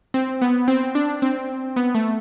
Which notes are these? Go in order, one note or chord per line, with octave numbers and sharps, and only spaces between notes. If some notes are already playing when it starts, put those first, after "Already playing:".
C4
B3
C4
D4
C4
B3
A3